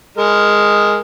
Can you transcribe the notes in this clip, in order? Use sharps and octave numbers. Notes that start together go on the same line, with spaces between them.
G#3 A#4 D#5